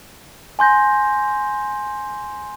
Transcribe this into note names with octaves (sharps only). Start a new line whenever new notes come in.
G#5 C6 G6 A#6